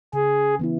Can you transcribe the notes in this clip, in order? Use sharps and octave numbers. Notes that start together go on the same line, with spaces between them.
C#3 G#4
E3 B3 E4